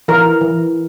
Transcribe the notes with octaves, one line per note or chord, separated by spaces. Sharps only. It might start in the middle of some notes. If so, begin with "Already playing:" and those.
E3 A#4
E3